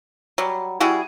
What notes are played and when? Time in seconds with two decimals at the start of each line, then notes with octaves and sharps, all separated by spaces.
0.38 F#3 G3
0.80 G3 E4 F#4 G#4